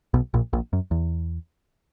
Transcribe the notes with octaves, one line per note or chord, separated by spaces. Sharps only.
B1 B2
A#1 A#2
A#1 A#2
F#2
E2